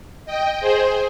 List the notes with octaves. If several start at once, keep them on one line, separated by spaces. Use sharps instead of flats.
D#5 G5
G#4 C5